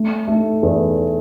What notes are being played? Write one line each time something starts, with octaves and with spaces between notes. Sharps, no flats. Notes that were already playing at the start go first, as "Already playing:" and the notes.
Already playing: A3
A3
E2